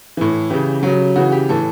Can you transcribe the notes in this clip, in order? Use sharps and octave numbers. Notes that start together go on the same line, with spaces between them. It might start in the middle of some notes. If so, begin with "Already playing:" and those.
A2 E3
C#3 E3 G4
C#3 F#3
C#3 E3 F#4
G4
A2 E3 A4